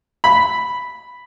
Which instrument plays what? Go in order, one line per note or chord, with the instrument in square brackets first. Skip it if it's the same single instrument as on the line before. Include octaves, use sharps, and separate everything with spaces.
[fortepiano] B5